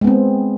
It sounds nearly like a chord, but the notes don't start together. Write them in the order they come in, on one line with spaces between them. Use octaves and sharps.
G#3 B3 C4